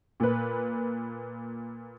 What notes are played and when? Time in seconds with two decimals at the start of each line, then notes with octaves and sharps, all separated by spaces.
0.20 A#2 B4